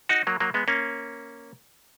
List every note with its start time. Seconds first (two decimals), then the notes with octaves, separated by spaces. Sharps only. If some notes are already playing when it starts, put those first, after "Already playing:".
0.09 D#4 F#4
0.27 F#3 A#3
0.40 F#3 A#3
0.54 G#3 B3
0.68 A#3 C#4